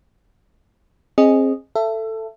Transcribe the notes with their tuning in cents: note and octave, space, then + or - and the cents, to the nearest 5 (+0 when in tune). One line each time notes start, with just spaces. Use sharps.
C4 +30 G#4 +0 D#5 -5
A4 +10 E5 +25